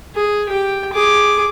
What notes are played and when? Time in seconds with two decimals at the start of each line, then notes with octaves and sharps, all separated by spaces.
0.15 G#4
0.48 G4 G5
0.92 G#4 D6